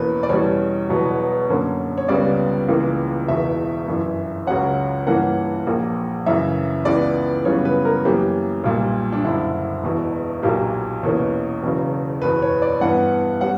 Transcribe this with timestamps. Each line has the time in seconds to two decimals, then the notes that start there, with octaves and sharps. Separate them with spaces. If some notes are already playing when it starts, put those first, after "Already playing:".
Already playing: E2 B2 A#3 C#4 B4
0.23 D5
0.29 E2 B2 G3 C#4 C#5
0.89 E1 E2 B2 F#3 B3
1.48 F#2 D3 A#3 C#4
1.97 C#5
2.08 C#2 C#3 G3 B3 D5
2.68 C#2 C#3 E3 A#3
3.28 E1 E2 B2 E5
3.88 G1 F#2 E3
4.47 C#2 C#3 F#3 C#4 F#5
5.06 G2 E3 A#3 C#4 F#5
5.67 A#1 A#2 A#3
6.26 F#2 C#3 E3 E5
6.85 C#2 C#3 E3 B3 D5
7.45 F#2 C#3 E3 G3 B3 C#5
7.65 B4
7.85 A#4
8.05 F#2 E3 A#3 C#4 G4
8.64 B1 A#2 G3
9.12 D4
9.24 F#1 F#2 D3 E4
9.84 E1 E2 B2
10.43 B1 A#2 F#3 A#3 G4
11.03 E2 B2 A#3 C#4
11.63 E1 E2 C#3 F#3
12.21 F#1 E2 B2 B4
12.42 C#5
12.62 D5
12.81 G2 E3 B3 F#5
13.41 G3 C#4 F#5